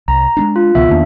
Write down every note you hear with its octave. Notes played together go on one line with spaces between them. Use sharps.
C2 A#5
G#3 B3 D4
F4
C#2 B2 E3 B3 E5
E2 D#3 A#3 D4